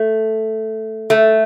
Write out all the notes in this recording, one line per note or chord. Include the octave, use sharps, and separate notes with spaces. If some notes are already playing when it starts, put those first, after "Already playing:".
Already playing: A3
A3